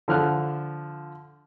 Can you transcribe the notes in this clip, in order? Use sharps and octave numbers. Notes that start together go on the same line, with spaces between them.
D3 F3 F6 F#6